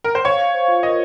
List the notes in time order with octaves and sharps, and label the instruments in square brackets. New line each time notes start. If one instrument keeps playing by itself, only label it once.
[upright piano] A#4
C5
[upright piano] C#5 [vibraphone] F5
[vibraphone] F5
C5
F4
[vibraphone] A#4 [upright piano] D#5